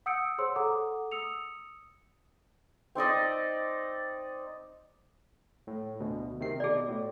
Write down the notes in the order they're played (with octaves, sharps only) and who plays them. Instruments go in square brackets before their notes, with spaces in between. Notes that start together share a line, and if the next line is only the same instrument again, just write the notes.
[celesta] F#5 D#6 E6 G6 C#7 D7
G#4 C5 C#5 C6 E6
G#4 A4 F#5 A#5 D6 D#6
D#6 E6 C#7 F7
[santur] C4 D#4 D5 D#5
[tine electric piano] A2
D2 B2
C3 D#3 C7
[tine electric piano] B2 [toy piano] G#4 D5
[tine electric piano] A2